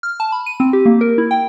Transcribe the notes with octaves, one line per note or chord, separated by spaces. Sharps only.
F6
A5
B5
D#7
C4
G4
A#3
A#4
E4
G5